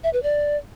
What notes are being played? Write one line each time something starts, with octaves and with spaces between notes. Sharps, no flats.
E5
B4
D5